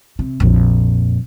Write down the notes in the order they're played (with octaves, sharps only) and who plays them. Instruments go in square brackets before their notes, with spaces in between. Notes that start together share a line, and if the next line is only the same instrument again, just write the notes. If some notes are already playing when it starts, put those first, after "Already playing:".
[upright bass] C3
A#1 F2